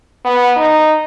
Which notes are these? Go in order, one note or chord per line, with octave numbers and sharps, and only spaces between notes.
B3
D#4